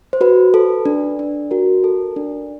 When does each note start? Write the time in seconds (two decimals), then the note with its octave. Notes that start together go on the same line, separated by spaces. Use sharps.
0.13 C5
0.21 F#4 B4
0.54 A4
0.85 D4
1.19 D4
1.51 F#4 A#4
1.84 A4
2.16 D4